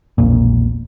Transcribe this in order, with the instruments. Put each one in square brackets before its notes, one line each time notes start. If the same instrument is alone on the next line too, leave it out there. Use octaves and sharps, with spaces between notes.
[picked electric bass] E1 A#1 A#2